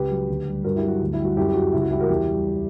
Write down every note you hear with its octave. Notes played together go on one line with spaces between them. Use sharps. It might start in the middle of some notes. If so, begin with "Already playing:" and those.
Already playing: C#2 G4 B4
F#3
D2
G3
G2 F#4 A#4
E4 G4
F#3 F#4
D2
G3 E4
F#4
F#2 E4 G4
G4
F#3 F#4
C#2 E4
F#4
G3 E4 G4
F#4 A#4
E2 E4 G4
G3